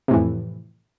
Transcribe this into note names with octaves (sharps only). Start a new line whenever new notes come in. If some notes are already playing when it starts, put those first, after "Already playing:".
F2 A2 C3 E3